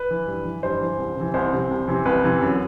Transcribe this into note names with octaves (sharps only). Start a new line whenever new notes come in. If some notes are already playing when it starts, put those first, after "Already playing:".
Already playing: B4
E3
G2
E3
G2 C5
E3
C2
C3 E3
C2 C5
C3 E3
C2
C3 E3
C2 B4
C3 E3
F#2